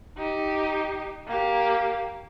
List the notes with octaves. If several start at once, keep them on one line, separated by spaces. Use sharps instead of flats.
D#4 G4
A#3 G4